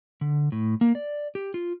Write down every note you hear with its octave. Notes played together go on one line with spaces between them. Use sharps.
D3
A2
A#3
D5
G4
F4